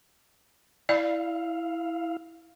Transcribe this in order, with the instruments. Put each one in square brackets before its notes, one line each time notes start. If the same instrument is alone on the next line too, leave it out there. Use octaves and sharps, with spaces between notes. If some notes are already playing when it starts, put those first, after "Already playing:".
[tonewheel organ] E4 F5 [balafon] D5